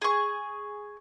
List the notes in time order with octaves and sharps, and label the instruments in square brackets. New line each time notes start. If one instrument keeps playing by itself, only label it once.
[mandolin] G#4 C#6